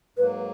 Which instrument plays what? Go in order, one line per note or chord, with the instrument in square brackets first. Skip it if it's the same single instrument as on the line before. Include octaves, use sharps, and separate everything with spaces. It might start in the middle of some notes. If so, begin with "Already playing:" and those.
[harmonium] G#2 F#3 A#3 [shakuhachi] B4